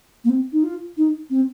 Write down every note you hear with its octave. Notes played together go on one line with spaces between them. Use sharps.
A#3
C4
D#4
F4
D#4
C4